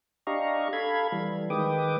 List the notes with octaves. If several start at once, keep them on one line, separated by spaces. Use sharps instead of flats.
D4 G4 D#5 F5 A#5 C#6
A4 F5 B5 G#6
E3 G3
D#3 G#3 B4 G5 D6 D#6